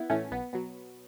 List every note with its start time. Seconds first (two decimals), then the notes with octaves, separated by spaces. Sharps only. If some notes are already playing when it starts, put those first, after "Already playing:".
Already playing: B3 E4
0.10 A2 E3 A3 C#4
0.31 B1 B3
0.53 B2 F#3